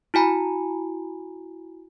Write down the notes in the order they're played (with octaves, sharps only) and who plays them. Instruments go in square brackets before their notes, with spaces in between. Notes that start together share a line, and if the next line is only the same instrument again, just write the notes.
[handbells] E4 F#4 G#5 A#5 B5